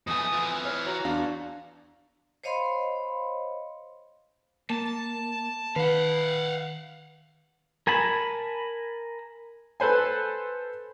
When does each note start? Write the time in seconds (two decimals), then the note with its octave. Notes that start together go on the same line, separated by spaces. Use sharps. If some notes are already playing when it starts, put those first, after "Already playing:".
0.07 F2 B2 A3 G#5 D#6
0.33 E3 F4
0.65 C#5 F6
0.86 F#4 A#5
1.05 E2 D4 F5
2.44 C5 C#5 D#5 F5 B5 C6
4.70 A#3 A5
5.76 D#3 B4 F5 F#5
7.87 A#4 G#5 A5 B5
9.80 A4 B4 C5 G#5